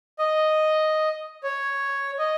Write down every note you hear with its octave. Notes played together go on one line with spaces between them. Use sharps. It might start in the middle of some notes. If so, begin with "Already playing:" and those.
D#5
C#5
D#5